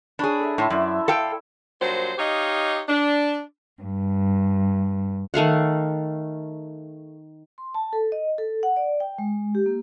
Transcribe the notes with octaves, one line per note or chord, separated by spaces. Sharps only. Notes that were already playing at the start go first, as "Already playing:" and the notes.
D4 G#4 C#5 B5
A4 E5
A2 C#5 A5 C6
F#2 E4 D5 E5
A4 F5 G5
G2 A#2 F#3 C5
D#4 G4 C#5 D#5 F5
D4
G2
D#3 A3 F5 F#5
C6
A5
A4
D#5
A4
F#5
D5
G5
G#3
G4
A#3